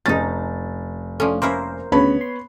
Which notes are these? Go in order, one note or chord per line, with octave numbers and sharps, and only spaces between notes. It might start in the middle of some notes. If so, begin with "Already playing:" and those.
F1 C#4 D#4 A6
F3 A3 C#4 D4
A#3 C#4 E4 A#4 C5
D2 C#3 B3 C#5 B5
C6